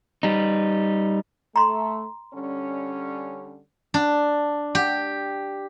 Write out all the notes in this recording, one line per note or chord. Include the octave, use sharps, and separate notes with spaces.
G3 D#4
A3 A#5 C6
D3 G3 C#4
D4
G4